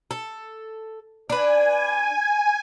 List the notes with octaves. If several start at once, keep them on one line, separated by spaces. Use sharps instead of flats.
A4
D4 B4 G#5